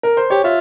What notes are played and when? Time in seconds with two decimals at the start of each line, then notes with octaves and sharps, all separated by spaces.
0.03 A#4
0.17 C5
0.30 G4 C#5
0.44 F4 E5